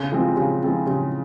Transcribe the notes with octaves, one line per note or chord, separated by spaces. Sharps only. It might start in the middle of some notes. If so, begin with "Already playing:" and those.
Already playing: C#3
F3 G#3 C4 F4
C#3
F3 G#3 C4 F4
C#3